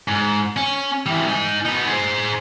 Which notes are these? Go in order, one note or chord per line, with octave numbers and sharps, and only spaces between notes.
G#2
C#4
E3 G3
D#4 G#5
B3 D#4
G#4 C5